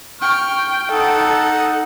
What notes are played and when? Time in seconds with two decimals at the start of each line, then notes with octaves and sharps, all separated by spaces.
0.22 G5 C#6 F6
0.92 D#4 A4 F#5